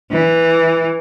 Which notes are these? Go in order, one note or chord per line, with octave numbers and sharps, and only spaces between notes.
E3